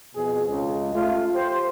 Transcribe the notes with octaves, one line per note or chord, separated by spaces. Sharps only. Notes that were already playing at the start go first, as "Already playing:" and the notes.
F2 B2 G#4
C#2 G#3
A3 F4
G4 C5